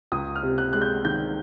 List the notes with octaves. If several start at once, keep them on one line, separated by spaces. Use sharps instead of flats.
C#2 D#6
F6
C3
F#6
G#3 F#6
G6
D#3 G6